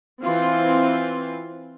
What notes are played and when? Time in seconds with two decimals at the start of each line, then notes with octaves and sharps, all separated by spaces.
0.23 E3 C4 F4